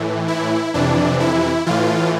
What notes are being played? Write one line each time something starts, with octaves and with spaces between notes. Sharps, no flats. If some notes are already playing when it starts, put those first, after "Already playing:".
Already playing: A2 E3
E4
F2 C3 E3 D4
E4
A2 E3 F4